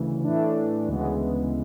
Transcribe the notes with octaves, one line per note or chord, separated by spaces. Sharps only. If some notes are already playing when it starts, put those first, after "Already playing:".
Already playing: D2 C#3 E3
A2 E3 A3 D4
D2 C#3 E3 G#3 B3